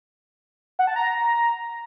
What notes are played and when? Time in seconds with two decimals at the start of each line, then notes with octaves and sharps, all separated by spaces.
0.79 F#5
0.87 A5
0.96 A#5